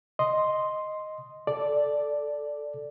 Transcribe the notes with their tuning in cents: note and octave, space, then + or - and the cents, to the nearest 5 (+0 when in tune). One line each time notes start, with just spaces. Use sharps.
D#5 +0 C6 +0
A4 +0 D5 +0